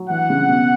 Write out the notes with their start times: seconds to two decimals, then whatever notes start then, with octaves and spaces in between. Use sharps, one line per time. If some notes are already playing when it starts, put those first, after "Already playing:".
Already playing: F#3
0.09 E3 F#5
0.30 C#3
0.48 B2